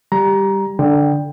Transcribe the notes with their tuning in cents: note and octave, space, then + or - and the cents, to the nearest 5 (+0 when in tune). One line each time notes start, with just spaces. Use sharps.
G3 +5 G4 +0 A#5 +15
D3 +0 G5 +10